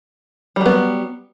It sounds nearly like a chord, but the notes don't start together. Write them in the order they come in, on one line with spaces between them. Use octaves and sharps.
G3 F#3 B3